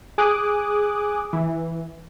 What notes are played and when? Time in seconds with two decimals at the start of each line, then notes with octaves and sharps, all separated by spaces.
0.18 G#4 G#5 D6 D#6 F#6
1.33 E3